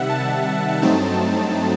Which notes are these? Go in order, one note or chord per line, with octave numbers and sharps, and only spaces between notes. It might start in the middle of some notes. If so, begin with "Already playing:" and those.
Already playing: C3 D#3 G3 E5 F#5
A5
G2 F#3 A3 C4 D#4